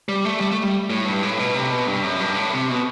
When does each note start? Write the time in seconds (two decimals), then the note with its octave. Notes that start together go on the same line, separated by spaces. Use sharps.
0.09 G3
0.25 A3
0.41 G3
0.51 A3
0.63 G3
0.90 A2
1.05 G2
1.23 A2
1.39 B2
1.54 C3
1.71 B2
1.87 G2
2.03 F#2
2.20 G2
2.36 A2
2.53 C3
2.70 B2